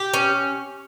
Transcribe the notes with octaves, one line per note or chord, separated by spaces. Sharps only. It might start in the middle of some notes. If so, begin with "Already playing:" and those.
Already playing: G4
C#4